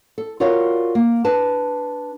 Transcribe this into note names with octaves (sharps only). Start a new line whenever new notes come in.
A4
F4 F#4 A#4 C#5 D5 F5
A#3
D4 B4 A5